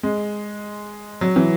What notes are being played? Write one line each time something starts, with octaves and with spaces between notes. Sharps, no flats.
G#3
F#3
E3